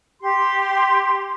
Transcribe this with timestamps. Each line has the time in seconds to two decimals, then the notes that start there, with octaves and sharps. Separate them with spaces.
0.20 G4 C6